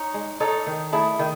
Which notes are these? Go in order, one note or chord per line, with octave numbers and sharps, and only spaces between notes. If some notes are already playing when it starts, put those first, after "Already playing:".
Already playing: D#4 C#5
G#3
D#4 A4 C#5
D#3
A3 E4 G#4
D#3